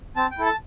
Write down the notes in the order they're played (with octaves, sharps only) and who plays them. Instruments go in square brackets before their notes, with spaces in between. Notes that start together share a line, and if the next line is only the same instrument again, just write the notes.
[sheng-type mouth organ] C4 A5
G5
E4 A4
A5